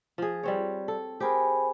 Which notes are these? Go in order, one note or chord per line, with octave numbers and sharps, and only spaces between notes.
F3 G#4
G3 C4 C#5
A4
G4 G#4 A#4 C5 G#5 B5